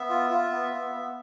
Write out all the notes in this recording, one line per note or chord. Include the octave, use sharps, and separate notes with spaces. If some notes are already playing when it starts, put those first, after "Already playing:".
Already playing: B3 E5
F4
F4
B3
B3
B3